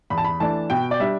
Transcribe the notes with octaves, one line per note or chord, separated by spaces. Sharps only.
E2 B5
A5
B5
E3 A3 D4 A5
B2 G5
D5
G3 D4 E5